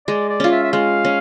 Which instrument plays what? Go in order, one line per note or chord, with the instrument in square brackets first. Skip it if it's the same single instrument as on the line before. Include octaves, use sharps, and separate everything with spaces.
[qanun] G#3 [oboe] D5
[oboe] D5
[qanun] C#4 F4
[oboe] E5
E5
[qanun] G#3 [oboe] F5
[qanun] C#4